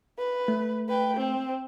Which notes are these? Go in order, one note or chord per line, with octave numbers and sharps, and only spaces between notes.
B4
A3
B4 G5
C4